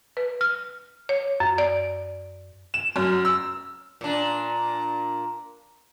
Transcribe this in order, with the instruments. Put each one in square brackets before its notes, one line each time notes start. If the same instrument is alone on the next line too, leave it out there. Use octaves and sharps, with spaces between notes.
[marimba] B4
F6
C#5
F#2
D5
[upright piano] E7
F#2
E6
[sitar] A#2 D4